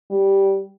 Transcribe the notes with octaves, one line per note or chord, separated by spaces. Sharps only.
G3